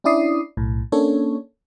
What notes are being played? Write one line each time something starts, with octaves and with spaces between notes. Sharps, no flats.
C#4 D4 E4 D5 D#6 C7
B1 A2
A#3 C#4 D4 A4 C#5